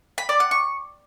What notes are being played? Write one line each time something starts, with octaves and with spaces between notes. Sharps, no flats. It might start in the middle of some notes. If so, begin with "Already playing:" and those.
B5
D5
F#5
C#6